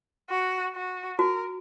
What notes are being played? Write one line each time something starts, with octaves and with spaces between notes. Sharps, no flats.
F#4
F#4
F#4 A#4